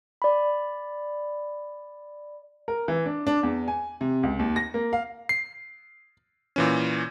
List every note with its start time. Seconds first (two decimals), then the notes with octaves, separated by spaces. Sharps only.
0.22 D5 B5
2.68 A#4
2.88 E3
3.06 D4
3.27 D4
3.43 E2
3.68 G#5
4.01 C3
4.23 C#2
4.39 D#2
4.56 A#6
4.74 A#3
4.93 F5
5.29 C7
6.56 A#2 E3 C#4